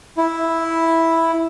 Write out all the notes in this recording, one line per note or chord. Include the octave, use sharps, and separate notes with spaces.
E4